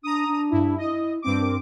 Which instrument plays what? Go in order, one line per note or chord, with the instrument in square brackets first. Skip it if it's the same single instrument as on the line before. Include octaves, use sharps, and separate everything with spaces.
[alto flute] D4 [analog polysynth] A#5 D#6
[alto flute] D4
[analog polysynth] G2 E4
[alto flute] E4 [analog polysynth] D#5
[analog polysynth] G2 C4 D6
[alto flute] A#4